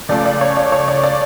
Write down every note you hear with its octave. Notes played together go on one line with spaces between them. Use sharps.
C#2 C#3 F3 A3 D5
D5
C#5
D5
C#5
D5
D5